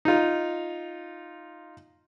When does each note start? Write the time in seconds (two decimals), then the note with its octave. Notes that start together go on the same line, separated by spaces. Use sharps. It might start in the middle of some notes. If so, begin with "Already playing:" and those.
0.05 D#4 F4